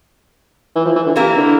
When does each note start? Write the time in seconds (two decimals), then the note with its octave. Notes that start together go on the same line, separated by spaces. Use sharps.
0.75 E3
0.85 F3
0.96 E3
1.06 D3
1.16 C3 E3 A#3 E4 A#4
1.37 D3